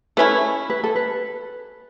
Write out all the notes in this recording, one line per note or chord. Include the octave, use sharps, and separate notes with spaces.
A3 C#4 E4 B4
B4
A4
B4